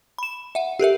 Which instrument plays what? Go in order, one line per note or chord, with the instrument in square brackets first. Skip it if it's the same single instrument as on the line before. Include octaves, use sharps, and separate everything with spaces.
[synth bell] B5 E7
E5 F#5
G4 A4 A#4 E5